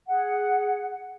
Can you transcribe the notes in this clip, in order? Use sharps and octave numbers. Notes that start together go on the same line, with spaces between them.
G#4 F#5